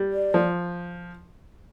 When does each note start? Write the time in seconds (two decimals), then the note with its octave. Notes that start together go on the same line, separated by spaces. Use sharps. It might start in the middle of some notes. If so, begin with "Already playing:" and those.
Already playing: G3
0.12 D5
0.34 F3